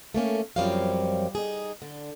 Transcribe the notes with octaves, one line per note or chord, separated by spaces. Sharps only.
A3 A#3 C#4
F#2 F3 G3 C4 C#5 F5
D#4 G#4
D3